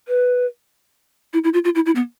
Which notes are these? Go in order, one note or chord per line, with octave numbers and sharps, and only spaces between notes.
B4
E4
E4
F4
F4
E4
E4
B3